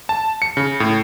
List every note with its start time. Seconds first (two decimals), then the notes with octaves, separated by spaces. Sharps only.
0.09 A5
0.42 C#7
0.57 C#3
0.80 A2